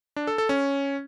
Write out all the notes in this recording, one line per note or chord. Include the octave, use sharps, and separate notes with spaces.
D4
A4
A4
C#4